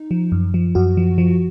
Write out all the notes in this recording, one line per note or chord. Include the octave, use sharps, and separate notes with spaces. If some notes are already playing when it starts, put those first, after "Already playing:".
Already playing: D#4
F3
F#2
F3
F#2 F#4
F3
F3